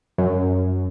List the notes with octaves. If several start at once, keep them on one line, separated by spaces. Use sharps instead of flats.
F#2